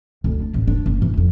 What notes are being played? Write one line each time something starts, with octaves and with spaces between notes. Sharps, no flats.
D2
D4
A1
D4
F#1
E3
F2